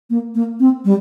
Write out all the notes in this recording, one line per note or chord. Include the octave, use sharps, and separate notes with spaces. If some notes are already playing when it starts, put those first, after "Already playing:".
A#3
A#3
C4
G3